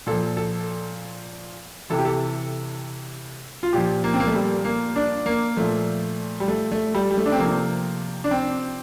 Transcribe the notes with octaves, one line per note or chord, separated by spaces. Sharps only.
A#2 F3 A4
A4
C3 E3 A4
G4
A4
F4
A#2 F3 G4
A#3
C4
A#3
A3
G3
A#3
D4
A#3
A#2 F3 A3
G3
A3
A3
G3
G3
A3
D4
C4
C3 F3 A#3
D4
C4